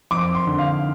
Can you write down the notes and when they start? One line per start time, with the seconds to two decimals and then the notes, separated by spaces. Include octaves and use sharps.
0.11 F2 D6
0.35 C6
0.47 D3
0.58 F5